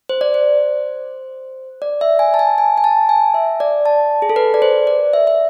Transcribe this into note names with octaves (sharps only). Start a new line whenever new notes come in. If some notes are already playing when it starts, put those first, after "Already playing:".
C5
D5
C5
D5
E5
G#5
A5
G#5
G#5
G#5
A5
G#5
E5
D5
A5
G#4
A4
B4
D5
C5
D5
E5
E5